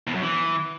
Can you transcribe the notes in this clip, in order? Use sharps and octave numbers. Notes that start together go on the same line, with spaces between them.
E2
F#2
E3